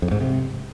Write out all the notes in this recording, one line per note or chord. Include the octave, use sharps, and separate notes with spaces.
F2
G#2
C3